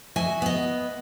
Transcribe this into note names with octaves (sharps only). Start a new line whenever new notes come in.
F#4 D#5 E5 G#5
B3 D#5